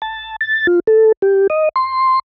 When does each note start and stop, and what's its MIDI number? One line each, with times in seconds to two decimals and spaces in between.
0.02 0.36 81
0.41 0.67 93
0.67 0.80 65
0.87 1.12 69
1.22 1.47 67
1.50 1.69 75
1.76 2.19 84